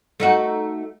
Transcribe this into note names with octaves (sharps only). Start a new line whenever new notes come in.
A3 D#4 F#4